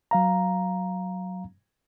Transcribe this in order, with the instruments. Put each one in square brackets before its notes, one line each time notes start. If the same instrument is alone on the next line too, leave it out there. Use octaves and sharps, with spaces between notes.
[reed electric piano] F#3 F5 A#5